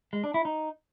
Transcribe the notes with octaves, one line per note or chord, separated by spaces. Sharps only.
G#3
D4
E4
D#4